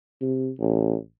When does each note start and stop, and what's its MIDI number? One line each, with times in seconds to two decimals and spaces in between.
0.21 0.49 48
0.59 0.94 33